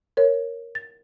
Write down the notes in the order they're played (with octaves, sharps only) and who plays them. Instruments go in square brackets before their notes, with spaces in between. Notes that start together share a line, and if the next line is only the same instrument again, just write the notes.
[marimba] A#4 C#5
A6